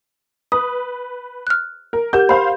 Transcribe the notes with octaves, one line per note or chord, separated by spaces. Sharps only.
B4 D#6
F6 F#6
A#4
G4 A#4 F#5 G6
C5 F5 B5 C6